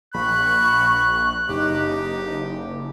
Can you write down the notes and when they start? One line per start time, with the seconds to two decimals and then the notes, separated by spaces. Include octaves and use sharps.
0.14 A#1 B5 C#6 F#6
1.49 F#1 D#4 G4